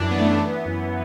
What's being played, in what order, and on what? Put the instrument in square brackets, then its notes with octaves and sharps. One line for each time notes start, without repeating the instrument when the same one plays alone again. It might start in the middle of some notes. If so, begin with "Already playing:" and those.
Already playing: [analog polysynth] F#2 E3 D4
F#2 B3
A3
B3
E3 B3
F#2